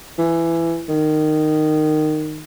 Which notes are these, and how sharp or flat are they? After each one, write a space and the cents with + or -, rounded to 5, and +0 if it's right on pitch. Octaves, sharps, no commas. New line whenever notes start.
E3 +15
D#3 -15